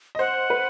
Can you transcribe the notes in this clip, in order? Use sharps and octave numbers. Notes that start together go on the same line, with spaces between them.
D#5
C5 F#5
B4